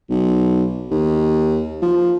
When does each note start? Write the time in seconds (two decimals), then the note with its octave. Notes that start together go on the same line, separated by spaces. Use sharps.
0.10 B1
0.91 D#2
1.83 F3